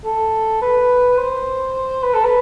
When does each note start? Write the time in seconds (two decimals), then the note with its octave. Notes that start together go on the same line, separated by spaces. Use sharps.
0.04 A4
0.61 B4
1.18 C5
2.03 B4
2.13 A4
2.24 B4